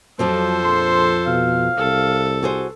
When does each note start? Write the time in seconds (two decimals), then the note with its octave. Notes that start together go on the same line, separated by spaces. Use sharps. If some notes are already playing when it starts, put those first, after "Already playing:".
0.19 F2 F3 F#3 C4 A4 C5
0.64 A#1 C6
1.27 B2 F5
1.77 C2 A4
2.43 F#4 G#4 C5